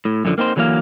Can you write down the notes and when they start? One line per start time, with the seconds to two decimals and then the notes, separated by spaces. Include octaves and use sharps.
0.05 A2
0.25 F#2 A2 D3 F3
0.38 A#3 C4 D#4 C5
0.56 D3 E3 F#3 A#3 F5